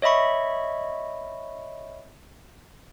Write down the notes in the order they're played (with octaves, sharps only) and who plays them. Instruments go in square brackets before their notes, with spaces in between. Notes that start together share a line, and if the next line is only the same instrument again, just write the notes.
[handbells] C#5 D#5 E5 B5 C#6